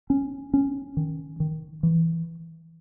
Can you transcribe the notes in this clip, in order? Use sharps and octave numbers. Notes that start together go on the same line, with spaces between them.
C#4
C#4
D#3
D#3
E3